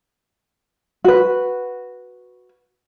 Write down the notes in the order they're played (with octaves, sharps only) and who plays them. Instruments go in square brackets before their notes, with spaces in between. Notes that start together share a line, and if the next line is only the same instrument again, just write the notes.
[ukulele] F#4 B4